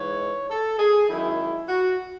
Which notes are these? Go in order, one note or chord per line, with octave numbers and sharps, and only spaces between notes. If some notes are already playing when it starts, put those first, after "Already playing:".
Already playing: G#2 E3 G#3 C#5
A4
G#4
F#2 D#3 G#3 E4
F#4